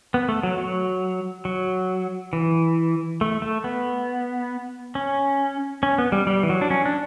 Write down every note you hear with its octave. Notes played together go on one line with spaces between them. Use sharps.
B3
A3
F#3
F#3
F#3
E3
A3
A3
B3
C#4
C#4
B3
G3
G3
E3
F#3
D4
C#4
D4